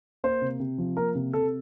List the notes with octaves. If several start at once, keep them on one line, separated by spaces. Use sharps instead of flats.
A#3 C5
C3
C3
F3
A#3 A#4
C3
C3 A4